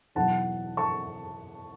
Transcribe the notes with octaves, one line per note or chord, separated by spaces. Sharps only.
E2 B2 F#3 F#5 A5
A5 C#6